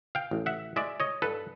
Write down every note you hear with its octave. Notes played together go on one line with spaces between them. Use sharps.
F5 G5
A1
E5 F#5
G#3 D5 E5
C#5 D#5
G2 A4 B4